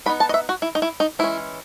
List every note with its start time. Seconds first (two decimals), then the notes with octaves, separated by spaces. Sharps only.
0.06 F#3 B3 D#4 B5
0.20 A5
0.29 D#5
0.34 E5
0.49 F#4
0.62 E4
0.75 D#4
0.82 E4
1.00 D#4
1.19 E3 G#3 C#4 E4